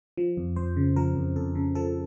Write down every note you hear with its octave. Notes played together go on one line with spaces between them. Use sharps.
F3
F2
F2 C5
C#3
F3 A#4
F2
F2 A4
C#3
F3 A4